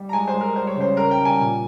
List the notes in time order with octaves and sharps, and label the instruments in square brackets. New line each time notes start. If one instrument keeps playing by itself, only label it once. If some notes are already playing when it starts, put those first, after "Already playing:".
Already playing: [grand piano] G3
A#5
G#3 G#5
C5
G#3
A#4
G3 C5
C#5
C#3 C5
C#3 A#4
G5
G3
G#5
A#2